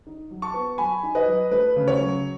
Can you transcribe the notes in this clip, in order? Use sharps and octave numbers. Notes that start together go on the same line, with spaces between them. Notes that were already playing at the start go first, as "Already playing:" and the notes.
D#4
F#3
A5 C#6
B3
F#3 G#5 B5
D#4
B4 D#5
F#3
A3 B4
C#3
C#5
F#3